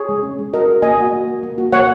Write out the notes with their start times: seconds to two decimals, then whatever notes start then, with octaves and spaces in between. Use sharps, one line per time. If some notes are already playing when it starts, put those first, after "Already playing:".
Already playing: G#4 C#5
0.09 G#3
0.23 C#4
0.39 G#3
0.53 F#4 A#4 D#5
0.67 F#4
0.82 A#3 D#5 G#5
0.97 F#4
1.13 A#3
1.28 A#3
1.43 A#3
1.58 F#4
1.72 A#3 C#5 F#5